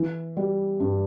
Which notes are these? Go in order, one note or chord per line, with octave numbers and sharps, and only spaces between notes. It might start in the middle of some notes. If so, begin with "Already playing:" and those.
Already playing: E3
G3
G2